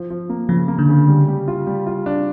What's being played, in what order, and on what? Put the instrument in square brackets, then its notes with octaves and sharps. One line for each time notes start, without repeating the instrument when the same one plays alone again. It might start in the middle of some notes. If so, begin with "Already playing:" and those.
Already playing: [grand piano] F3
F3
A#3
[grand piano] C#3 [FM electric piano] F3
[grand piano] A#3
[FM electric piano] D3
[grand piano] C#3
G3
G3
F4
G3
F4
D4